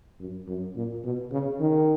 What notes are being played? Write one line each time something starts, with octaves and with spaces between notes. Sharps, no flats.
F#2
F#2
A#2
B2
C#3
D#3